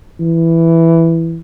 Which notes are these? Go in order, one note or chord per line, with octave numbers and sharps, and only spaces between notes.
E3